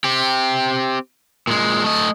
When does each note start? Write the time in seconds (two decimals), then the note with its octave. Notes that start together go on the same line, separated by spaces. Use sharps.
0.04 C4 G4
1.47 A#2 G#3
1.84 A3 D#5